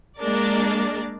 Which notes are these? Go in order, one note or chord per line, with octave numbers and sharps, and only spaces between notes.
G#3 A#3 D4 A#4 D5